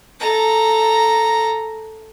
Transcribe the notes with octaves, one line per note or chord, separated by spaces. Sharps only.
A4 A#5